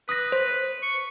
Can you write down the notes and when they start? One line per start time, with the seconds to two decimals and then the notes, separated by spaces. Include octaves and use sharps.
0.09 B4 D#6 A#6
0.32 C5
0.83 C#6